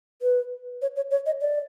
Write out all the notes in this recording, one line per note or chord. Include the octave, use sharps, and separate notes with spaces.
B4
C#5
C#5
C#5
D#5
D5